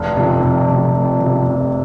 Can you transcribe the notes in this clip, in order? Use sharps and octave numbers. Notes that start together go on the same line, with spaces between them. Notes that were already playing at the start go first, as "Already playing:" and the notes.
Already playing: F1
F2 C3
F1
F2 C3
F1
F2
C3
F1